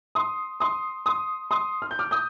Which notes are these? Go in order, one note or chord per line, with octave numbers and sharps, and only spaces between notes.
C6 D#6
C6 D#6
C6 D#6
C6 D#6
F6
G6
D6 F6
D#6 G6